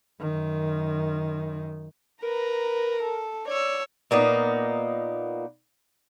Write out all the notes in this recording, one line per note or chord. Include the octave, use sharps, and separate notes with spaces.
F#2 D#3
A#4 B4 A#5
A4
C#5 D5 E6
A#2 A#3 B3 D#4